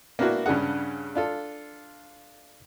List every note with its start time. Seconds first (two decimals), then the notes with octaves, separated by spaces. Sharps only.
0.19 A#3 B3 D4 E4 F#4
0.46 G2 C#3 D4 G#4 F#5
1.15 D4 F4 A4